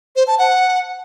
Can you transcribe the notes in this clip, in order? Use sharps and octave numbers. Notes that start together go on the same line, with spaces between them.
C5
A5
F#5